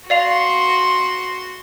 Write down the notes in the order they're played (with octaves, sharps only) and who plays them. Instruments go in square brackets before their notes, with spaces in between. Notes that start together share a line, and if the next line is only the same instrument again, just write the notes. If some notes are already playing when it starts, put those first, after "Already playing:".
[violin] F#4 C6 [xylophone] D5 F5 F7